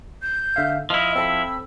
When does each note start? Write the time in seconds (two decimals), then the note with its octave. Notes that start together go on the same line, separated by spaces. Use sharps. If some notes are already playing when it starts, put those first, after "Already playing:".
0.22 G6
0.56 D3 E5 F5
0.90 F3 E4 D#5 F6
1.15 C4 A4 B5 E6